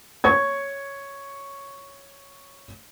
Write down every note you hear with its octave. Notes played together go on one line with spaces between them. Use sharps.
C#5 C#6 G#6